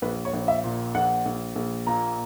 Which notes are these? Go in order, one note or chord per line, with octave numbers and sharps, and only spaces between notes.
A#1 B4
C#5
A#1
E5
A#2
A#1 F#5
A#1
A#1
A#2 A#5